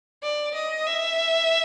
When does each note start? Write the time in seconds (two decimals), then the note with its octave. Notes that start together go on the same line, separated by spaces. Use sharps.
0.23 D5
0.55 D#5
0.87 E5